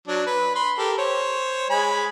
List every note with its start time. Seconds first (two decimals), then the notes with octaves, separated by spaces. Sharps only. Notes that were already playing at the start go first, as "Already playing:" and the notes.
0.08 F#3 D4
0.26 B4
0.55 B5 C6
0.78 G4 A4 A#4
0.98 C5 C#5
1.70 G#3 G#5 B5